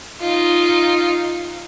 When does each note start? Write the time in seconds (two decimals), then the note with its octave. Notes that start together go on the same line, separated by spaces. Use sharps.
0.21 D#4 F4